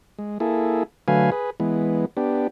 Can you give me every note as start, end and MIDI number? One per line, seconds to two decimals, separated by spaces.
0.19 0.38 56
0.40 0.83 58
0.40 0.83 64
0.40 0.83 68
0.40 0.83 69
1.08 1.30 50
1.08 1.30 54
1.08 1.30 57
1.08 1.30 71
1.08 1.30 77
1.08 1.30 80
1.32 1.50 68
1.32 1.50 71
1.60 2.05 52
1.60 2.05 56
1.60 2.05 59
2.17 2.47 59
2.17 2.47 62
2.17 2.47 67